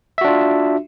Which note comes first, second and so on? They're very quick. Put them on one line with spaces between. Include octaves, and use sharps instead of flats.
E5 F#4 D4 F4